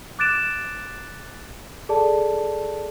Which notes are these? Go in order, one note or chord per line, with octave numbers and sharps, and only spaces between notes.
D6 F#6 A6 D7 E7
G#4 A4 D5 A5